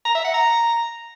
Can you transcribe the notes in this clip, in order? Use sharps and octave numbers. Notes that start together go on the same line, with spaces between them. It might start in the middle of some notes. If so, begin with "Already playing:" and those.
A#5
E5
F#5
A#5